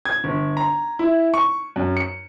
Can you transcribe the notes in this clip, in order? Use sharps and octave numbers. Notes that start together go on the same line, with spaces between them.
G#6
G1
A#5
E4
C#6
F#2
C#7